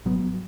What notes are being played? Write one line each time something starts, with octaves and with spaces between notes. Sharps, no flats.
G#1 F#3 B3